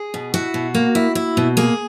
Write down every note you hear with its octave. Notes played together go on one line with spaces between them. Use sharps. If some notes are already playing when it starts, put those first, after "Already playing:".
Already playing: G#4
B2
E4 F#4
B2
A#3
E4
E4
B2
A#3 G#4